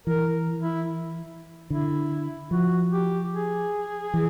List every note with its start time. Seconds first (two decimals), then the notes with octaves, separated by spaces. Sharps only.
0.07 E3 A#4
0.62 E4
1.70 D3 E4
2.51 F3 F#4
2.92 G4
3.33 G#4
4.14 E3